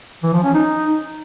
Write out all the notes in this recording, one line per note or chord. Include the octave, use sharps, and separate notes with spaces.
E3
F3
C#4
D#4